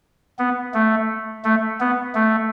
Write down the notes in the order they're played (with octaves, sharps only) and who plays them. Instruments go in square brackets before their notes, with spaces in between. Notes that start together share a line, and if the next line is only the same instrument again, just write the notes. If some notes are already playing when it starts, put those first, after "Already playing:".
[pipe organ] B3
A3
A3
B3
A3